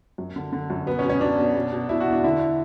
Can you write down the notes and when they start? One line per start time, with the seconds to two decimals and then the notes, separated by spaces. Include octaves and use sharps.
0.18 F#2
0.36 D3
0.52 D3
0.70 F#2
0.86 B2 B3
0.99 C#4
1.04 B2
1.09 C#4
1.21 B2 D4
1.38 B2
1.55 B2
1.72 B2
1.89 B2 E4
2.00 F#4
2.07 E2
2.13 D4
2.24 D3 E4